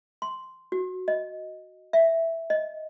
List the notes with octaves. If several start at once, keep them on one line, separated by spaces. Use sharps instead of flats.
C6
F#4
D#5
E5
D#5